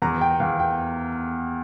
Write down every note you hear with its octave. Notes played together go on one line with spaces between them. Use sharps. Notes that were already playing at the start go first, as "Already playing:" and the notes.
E2 A#5
G5
E2 F5
G5